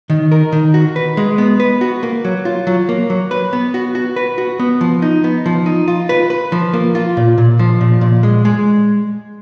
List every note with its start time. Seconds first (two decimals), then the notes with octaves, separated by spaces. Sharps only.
0.10 D#3
0.32 A#4
0.52 D#3
0.74 F#4
0.96 B4
1.17 G#3
1.38 B3
1.60 B4
1.81 F#4
2.03 A#3
2.25 F#3
2.45 F4
2.67 F#3
2.89 A#3
3.10 F#3
3.31 B4
3.53 B3
3.74 F#4
3.95 F#4
4.16 B4
4.38 F#4
4.60 B3
4.81 F3
5.02 D#4
5.24 B3
5.46 F3
5.66 D#4
5.88 F4
6.09 B4
6.30 B4
6.52 F3
6.74 A#3
6.95 F4
7.17 A#2
7.38 A#2
7.59 F3
7.81 A#2
8.01 A#2
8.23 G#3
8.45 G#3